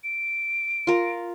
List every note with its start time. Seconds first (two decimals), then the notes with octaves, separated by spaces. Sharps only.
0.04 D7
0.87 F4 A#4